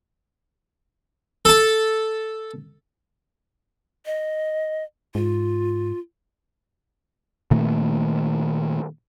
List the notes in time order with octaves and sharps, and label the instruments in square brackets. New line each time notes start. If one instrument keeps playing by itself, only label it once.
[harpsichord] A4 A5
[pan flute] D#5
[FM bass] G#2 [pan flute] F4
[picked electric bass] A#2 D#3 A3 A#3